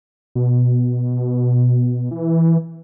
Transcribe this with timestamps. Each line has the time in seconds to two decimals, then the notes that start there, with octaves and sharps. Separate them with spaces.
0.35 B2
2.11 E3